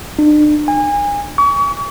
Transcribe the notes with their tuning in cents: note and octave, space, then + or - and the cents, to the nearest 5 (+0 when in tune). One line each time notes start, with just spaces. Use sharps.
D4 +40
G#5 -30
C#6 +40